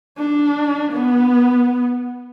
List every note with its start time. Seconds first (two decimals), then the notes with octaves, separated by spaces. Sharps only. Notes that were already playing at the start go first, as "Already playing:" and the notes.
0.18 D4
0.92 B3